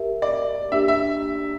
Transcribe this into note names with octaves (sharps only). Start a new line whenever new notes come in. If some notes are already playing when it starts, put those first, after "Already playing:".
Already playing: G4 A#4 E5
D5
A#3 D4 G4 E5
E5